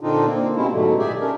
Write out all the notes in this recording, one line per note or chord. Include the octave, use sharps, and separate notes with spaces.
A#2 D3 C4 D4 D#4 F4
A#3 C4
B2 G3 G#3 A#3 C#4 E4
G#2 B2 D3 F#3 A3
A#2 G4 G#4 D5 E5
C#4 D4 A#4